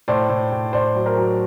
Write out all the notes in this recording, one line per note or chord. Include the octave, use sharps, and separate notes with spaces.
A2 C5 D5
A2
A2
A2 C5 D5
F#3
A#4 C5
F#3